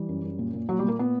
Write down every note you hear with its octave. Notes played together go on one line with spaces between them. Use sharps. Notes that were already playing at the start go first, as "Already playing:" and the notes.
Already playing: E3 G3
F#2
F#2
A#2
A#2
A#2 F#3
G3
A#2 A#3
B3